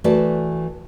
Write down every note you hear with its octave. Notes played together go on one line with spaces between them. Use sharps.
E3 A3 F#4 B4 D5